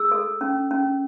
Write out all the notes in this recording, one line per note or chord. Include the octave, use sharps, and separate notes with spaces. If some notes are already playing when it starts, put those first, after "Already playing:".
Already playing: G#4 E6
A4
C#4
C#4